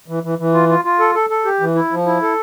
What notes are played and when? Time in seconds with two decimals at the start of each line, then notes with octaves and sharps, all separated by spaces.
0.08 E3
0.23 E3
0.39 E3
0.54 F4
0.69 F4
0.85 F4
1.00 A4
1.15 A4
1.30 A4
1.45 G4
1.60 E3
1.75 E4
1.91 F3
2.06 E4
2.22 A4